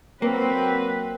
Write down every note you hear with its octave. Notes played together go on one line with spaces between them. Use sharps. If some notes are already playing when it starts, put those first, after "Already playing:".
F#3 A#3 C4 B4